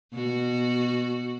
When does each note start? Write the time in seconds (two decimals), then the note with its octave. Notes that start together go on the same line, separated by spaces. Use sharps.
0.13 B2 F#4